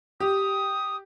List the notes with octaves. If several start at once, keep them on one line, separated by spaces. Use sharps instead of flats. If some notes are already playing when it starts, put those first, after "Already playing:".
G4 D#6